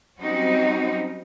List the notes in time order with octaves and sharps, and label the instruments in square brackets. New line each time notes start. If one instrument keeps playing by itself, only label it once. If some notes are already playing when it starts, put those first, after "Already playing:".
[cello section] F#3 G3 C4 C#4 D#4 F#4